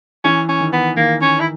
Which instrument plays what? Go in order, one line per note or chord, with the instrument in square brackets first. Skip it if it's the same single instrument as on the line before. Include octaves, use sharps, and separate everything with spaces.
[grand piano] E3 [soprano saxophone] C#4
[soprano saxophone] C#4
[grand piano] D#3
[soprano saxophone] B3
[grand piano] D#3 [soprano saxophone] A#3
[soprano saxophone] C#4
E4